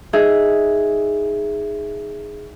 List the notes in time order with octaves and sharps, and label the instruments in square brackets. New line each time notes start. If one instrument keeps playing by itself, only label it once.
[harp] D#4 G#4 E5